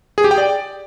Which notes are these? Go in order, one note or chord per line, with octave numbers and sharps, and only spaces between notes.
G#4
G4
G5
D5